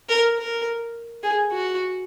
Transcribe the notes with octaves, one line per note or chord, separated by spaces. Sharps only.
A#4
A#4
G#4
F#4